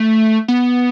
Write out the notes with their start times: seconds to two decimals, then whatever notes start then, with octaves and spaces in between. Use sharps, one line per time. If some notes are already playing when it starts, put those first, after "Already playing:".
Already playing: A3
0.48 B3